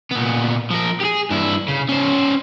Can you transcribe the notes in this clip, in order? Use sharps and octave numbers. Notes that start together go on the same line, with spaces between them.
A#2 B3
F3 A#4
G4 G#4
G2 E4
C#3
C#4 C5